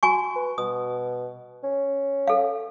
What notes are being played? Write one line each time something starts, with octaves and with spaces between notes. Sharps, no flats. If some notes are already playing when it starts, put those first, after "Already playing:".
F#4 G#5 C#6
B4
B2 D#6
C#4
A4 F5